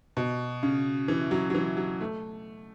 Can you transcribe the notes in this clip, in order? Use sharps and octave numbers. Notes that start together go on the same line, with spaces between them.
B2
C#3
E3
F#3
F#3
E3
F#3
A3